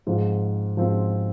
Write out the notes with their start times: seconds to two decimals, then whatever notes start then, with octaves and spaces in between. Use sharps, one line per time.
0.07 G#2 F3 C4
0.77 G#2 F3 C4